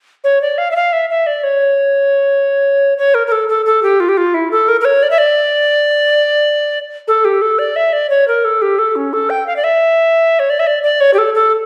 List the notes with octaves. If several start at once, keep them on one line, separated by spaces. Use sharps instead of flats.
C#5
D5
F5
E5
F5
E5
E5
D5
C#5
C#5
A#4
A#4
A4
A4
A4
G4
F4
G4
F4
E4
A4
A#4
A#4
C#5
D5
E5
D5
A4
G4
A4
D5
E5
D5
C#5
A#4
A4
G4
A4
C#4
A4
G5
F5
D5
E5
C#5
D5
E5
D5
D5
C#5
G4
A4
A4